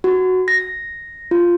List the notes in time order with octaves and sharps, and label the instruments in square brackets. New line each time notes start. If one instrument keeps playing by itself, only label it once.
[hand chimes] F#4
A#6
F4